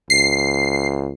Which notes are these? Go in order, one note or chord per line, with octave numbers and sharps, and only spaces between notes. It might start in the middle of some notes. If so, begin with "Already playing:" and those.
C#2 C7